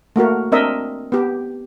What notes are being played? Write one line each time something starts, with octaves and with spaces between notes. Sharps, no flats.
A3 A#3 F#4 A#4
C4 D4 A#4 D#5 E5
B3 G4